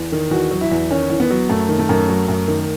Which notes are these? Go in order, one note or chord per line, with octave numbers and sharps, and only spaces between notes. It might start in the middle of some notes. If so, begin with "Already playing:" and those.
Already playing: E2
D#3
E2 F#4
F#3
E4
E2
D#3 C#4
E2
B3
F#3
F#2 A3
D#3
A3
F#2
F#3
F#2
D#3